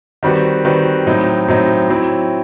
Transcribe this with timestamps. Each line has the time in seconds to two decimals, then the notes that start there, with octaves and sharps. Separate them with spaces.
0.23 D#3 G3 C4 F#4 B4
0.65 D#3 G3 C4 F#4 B4
1.06 A2 F#3 C4 D#4
1.48 A2 F#3 C4 D#4
1.90 F#3 C4 E4